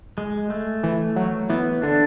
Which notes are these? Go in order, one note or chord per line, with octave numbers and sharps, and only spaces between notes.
G#3
A3
E3
F#3
E3 B3
D3 D4